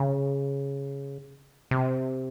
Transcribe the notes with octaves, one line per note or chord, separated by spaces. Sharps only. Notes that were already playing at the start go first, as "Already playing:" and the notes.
Already playing: C#3
C3